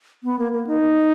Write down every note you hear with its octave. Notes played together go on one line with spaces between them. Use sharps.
B3
A#3
A#3
D#4